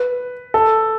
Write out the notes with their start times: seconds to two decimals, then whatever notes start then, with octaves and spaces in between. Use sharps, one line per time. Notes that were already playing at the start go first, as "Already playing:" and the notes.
Already playing: B4
0.54 A4